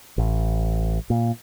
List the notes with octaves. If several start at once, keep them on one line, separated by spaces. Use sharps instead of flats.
A1
A#2